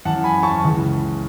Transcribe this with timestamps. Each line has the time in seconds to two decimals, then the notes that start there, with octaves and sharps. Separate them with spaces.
0.05 F#2 E3 F#5 A5
0.24 G#5 B5
0.43 A5 C#6
0.63 C#2 C#3 E3